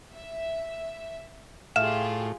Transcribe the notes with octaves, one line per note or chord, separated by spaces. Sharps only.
E5
A2 F4 G4 G#4 E5 F5 F6 E7